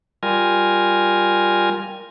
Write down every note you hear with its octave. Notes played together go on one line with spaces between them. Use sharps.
G3 F4 A#4 G#5